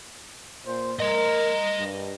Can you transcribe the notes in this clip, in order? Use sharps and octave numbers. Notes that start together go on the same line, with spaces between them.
A#2 C5
A#4 D#5 C6
G2